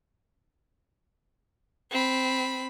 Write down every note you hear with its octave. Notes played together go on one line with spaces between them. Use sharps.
C4 B5